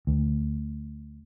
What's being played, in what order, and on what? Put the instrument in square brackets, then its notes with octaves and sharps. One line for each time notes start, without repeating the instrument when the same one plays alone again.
[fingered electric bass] D2